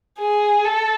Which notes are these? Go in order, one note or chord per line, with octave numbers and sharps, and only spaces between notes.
G#4
A4